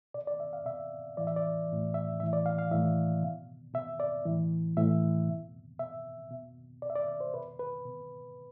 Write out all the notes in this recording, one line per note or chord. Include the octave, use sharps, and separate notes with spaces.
B2 D5
D5
E5
F5
B2 E5
A2 E3 D5
E5
D5
A2 E3
E5
A2 E3 E5
D5
F5
F5
A2 E3 E5
B2
B2 E5
D5
A2 E3
A2 E3 E5
B2
B2 E5
B2
B2 D5
E5
D5
D5
C5
B2 B4
B4
B2